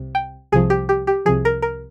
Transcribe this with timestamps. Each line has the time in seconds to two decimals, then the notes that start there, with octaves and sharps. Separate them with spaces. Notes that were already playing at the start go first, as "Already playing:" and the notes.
Already playing: C2 C3
0.15 G5
0.52 C2 C3 F3 G#4
0.70 G4
0.89 G4
1.07 G4
1.25 C2 C3 F3 G#4
1.45 A#4
1.62 A#4